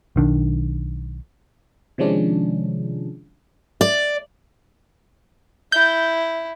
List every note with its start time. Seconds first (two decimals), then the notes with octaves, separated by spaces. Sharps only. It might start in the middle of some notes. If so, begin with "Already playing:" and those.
0.16 B1 D#3 D4
1.98 C3 D#3 F3 G#3 C#4 D4
3.81 D5
5.72 E4 G6